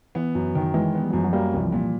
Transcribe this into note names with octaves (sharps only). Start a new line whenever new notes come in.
E3 B3
F#2
D#3
E3 G#3
B3
G3
F#3
F#2 F3
F#3
G3 A#3
C2 E3
F3
A#2